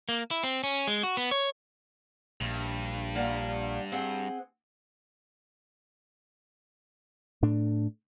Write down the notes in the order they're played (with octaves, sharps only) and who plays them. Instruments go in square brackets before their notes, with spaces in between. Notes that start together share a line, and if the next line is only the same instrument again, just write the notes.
[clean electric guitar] A#3
E4
C4
C#4
G#3
F#4
B3
C#5
[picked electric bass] A#1 [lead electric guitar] G2
[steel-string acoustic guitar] A#3 D5 F#5
C4 G#4 F#5
[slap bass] A2 A3 D4